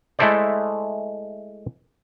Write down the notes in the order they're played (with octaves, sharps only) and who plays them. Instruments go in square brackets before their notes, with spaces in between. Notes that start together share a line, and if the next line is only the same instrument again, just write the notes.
[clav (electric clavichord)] G#3 A3 E4 A4 C5 D5